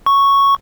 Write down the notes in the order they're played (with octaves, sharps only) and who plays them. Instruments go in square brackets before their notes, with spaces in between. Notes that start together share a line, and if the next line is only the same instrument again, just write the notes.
[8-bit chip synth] C#6